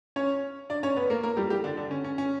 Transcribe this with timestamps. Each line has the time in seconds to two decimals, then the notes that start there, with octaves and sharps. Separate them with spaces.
0.16 C#4 C#5
0.70 D4 D5
0.83 C#4 C#5
0.97 B3 B4
1.10 A#3 A#4
1.23 A#3 A#4
1.37 G3 G4
1.50 G3 G4
1.64 D3 D4
1.77 D3 D4
1.91 C#4
2.04 C#4
2.18 C#4